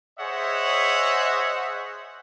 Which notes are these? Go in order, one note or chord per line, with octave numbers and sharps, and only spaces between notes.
G#4 C5 C#5 D#5 E5 F#5